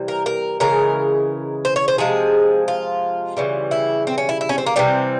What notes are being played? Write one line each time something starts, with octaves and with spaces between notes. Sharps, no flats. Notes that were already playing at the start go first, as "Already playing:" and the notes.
Already playing: C3 E3 G3
A#4
A#4
C#3 E3 G#3 A#4
C5
C#5
C5
C3 F3 G#3 G#4
F4
C#3 E3 G3
E4
C4
C#4
E4
E4
C#4
C4
A#3
C3 E3 G3 C4